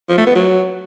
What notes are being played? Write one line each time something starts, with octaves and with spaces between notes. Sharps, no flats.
F3
A3
B3
F#3